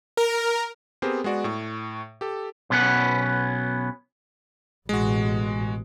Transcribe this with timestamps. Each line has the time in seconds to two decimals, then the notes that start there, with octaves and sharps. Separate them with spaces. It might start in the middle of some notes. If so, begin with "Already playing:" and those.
0.17 A#4
1.02 B3 C4 G4 G#4 A#4 C5
1.24 G#3 B3 F#4 D5
1.44 A2 C#6
2.21 G4 A4
2.70 B1 B2 B3 C#4 F#5
4.89 A1 B2 G#3 F#4